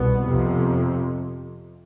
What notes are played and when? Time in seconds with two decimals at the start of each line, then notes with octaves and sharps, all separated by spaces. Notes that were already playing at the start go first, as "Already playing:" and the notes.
Already playing: C2 B2 B3
0.25 F2 C3